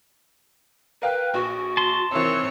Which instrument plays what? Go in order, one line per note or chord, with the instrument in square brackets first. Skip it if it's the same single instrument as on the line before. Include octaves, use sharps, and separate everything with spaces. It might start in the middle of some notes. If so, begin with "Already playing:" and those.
[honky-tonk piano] A#4 F5 G5 [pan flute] B4
[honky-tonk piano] A#1 [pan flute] F#4
[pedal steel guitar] A5 C6
[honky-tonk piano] C3 D#3 E3 [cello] C4 C#5 [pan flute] E6